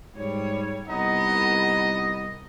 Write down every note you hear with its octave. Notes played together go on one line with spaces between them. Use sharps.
G#2 G3 C#5
C2 B3 D#4 D#5